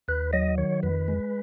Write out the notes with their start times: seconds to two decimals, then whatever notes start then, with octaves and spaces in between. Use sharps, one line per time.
0.08 D#2 B4
0.33 F#3 D#5
0.58 D#3 C#5
0.83 F2 B4
1.08 G#3